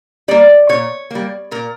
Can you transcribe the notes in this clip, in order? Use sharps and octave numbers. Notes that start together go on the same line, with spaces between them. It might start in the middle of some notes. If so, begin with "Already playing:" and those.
G3 A#3 D5
A#2 C#5
G3 A#3
A#2 A#4